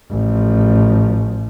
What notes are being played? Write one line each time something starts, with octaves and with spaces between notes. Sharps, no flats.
A1 F3